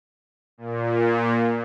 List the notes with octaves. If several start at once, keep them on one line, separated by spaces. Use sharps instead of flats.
A#2